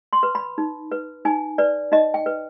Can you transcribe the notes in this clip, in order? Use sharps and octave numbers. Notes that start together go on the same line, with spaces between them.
C6
B4
B5
D#4
B4
D#4 G#5
B4 D5
D#4 D#5
G5
B4